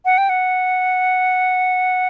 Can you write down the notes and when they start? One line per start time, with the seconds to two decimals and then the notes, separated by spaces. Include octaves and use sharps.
0.05 F#5
0.18 G5
0.29 F#5